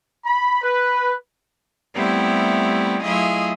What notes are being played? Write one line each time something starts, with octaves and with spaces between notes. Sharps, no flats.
B5
B4
G3 A3 B3 C4 E4 G4
F#3 A3 E4 F4 G#4 D#5